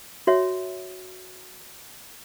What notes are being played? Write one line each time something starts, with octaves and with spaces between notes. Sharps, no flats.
F#4 C#5 E5